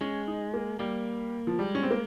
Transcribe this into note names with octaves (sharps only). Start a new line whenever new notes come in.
G#3 C#4
D#4
A#3
G3 A#3
F3
G3 G#3
C#4
C4
A#3